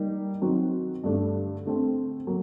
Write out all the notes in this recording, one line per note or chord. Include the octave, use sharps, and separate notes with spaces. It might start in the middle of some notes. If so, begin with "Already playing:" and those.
Already playing: G3 A#3 D#4 G4
D#3 F#3 C4 D#4 F#4
G2 D3 A3 D4
D3 A3 C4
F#3 A#3